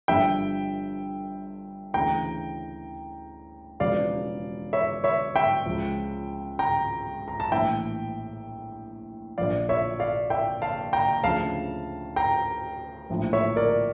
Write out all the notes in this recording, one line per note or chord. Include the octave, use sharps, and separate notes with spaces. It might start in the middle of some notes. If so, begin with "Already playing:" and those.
G1 G2 D3 F3 E5 G5
D2 C#3 E3 G5 A#5
E1 E2 C#3 F3 D5 F5
C#5 E5
C#5 E5
E5 G5
C#2 C#3 F3
G5 A#5
A#5
A5
A#1 A2 E3 E5 G5
A#1 A#2 F3 D5 F5
C#5 E5
D5 F5
E5 G5
F5 A5
G5 A#5
D2 C#3 F3 F5 A5
G5 A#5
A#1 A2 F3
C#5 E5
A#4 D5